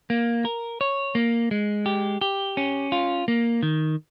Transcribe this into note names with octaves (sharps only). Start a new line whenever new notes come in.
A#3
A#4
C#5
A#3
G#3
G4
G4
C#4
F4
A#3
D#3